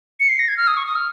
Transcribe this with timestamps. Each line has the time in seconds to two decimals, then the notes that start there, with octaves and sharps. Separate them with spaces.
0.20 C#7
0.29 C7
0.39 A#6
0.48 G#6
0.57 F6
0.67 D#6
0.77 C#6
0.86 D#6
0.95 F6